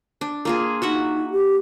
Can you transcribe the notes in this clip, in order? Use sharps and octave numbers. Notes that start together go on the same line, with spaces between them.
D4
A#3 F4 G#4
D#4 F#4 E5 F#5
G4